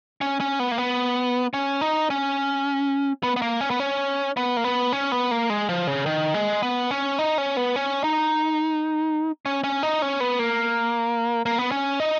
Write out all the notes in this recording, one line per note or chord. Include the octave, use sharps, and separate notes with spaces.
C#4
C#4
B3
A#3
B3
C#4
D#4
C#4
B3
B3
A#3
C#4
B3
C#4
B3
A#3
B3
C#4
B3
A#3
G#3
F3
C#3
D#3
G#3
B3
C#4
D#4
C#4
B3
C#4
D#4
C#4
C#4
D#4
C#4
B3
A#3
A#3
B3
C#4
D#4